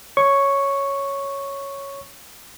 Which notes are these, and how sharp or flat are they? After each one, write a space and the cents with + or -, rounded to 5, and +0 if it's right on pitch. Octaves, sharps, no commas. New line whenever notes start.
C#5 +0 C#6 +0